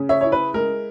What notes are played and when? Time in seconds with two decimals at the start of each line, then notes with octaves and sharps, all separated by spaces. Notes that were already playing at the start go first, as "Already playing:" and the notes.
Already playing: C#3 C#4
0.09 C#5 E5
0.21 E4 C#5
0.32 B4
0.54 G#3 A#4